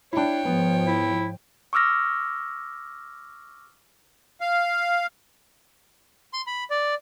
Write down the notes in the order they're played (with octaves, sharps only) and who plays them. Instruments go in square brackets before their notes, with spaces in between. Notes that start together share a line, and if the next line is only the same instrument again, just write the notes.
[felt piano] D4 E4 [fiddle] C#5 G5
[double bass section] G#2 F3 [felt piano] B3
[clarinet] E4
[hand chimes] C#6 D6 E6 F6 A#6
[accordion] F5
[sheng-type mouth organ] C6
B5
D5